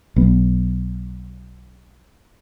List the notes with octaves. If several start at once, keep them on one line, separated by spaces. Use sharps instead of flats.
B1 B3